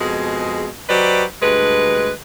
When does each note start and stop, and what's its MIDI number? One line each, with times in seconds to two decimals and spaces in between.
0.01 0.67 41
0.01 0.67 47
0.01 0.67 56
0.01 0.67 68
0.89 1.23 54
0.89 1.23 67
0.89 1.23 71
0.89 1.23 72
0.89 1.23 74
0.89 1.23 75
1.42 2.10 38
1.42 2.10 43
1.42 2.10 56
1.42 2.10 71